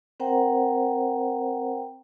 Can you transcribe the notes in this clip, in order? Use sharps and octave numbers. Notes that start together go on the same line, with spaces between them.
C4 A#4 C5 F#5 G5 A#5